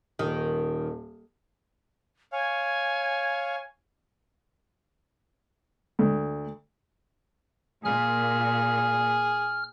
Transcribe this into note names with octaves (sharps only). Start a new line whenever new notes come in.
D#1 D#3
C#5 F5 G#5
D2
A#2 G#4 F6